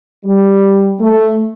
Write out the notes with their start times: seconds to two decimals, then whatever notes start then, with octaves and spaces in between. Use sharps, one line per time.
0.25 G3
1.00 A3